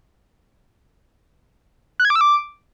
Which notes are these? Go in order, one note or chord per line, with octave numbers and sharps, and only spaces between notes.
F#6
G#6
D6
E6
D6